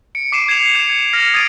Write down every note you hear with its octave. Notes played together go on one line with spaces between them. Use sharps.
C#7 D7
D6 C7 D#7 E7
G#6 C7 E7 F7
G#6 C#7 E7
F6 A#6
D#6 G#6 A6 D7 D#7